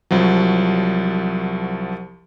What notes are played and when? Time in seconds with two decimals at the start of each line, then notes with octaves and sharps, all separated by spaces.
0.11 C2 F3 F#3